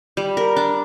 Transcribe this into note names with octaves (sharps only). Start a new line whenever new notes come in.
G3
A#4
D4